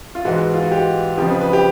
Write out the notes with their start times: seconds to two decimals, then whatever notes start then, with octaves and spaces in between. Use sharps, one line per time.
0.15 F4
0.25 G#2 E3 G#3 F#4
0.54 F4
0.63 F#4
0.71 G4
1.18 F2 C#3 F3 G4
1.30 B4
1.41 B4
1.53 G4